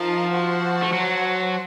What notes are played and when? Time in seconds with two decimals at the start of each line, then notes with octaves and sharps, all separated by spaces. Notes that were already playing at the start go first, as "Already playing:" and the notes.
Already playing: F3 D#4 A#4 F5 A5
0.31 F#4 C5 F#5 A5
0.82 A3
0.93 F#3